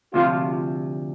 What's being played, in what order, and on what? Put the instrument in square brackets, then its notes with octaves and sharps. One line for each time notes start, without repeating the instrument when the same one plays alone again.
[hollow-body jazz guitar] D2 C3 F3 [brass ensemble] F4